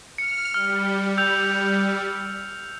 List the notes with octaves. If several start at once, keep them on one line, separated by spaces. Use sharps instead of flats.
F6 C#7
G3 F6
E6 G6 F7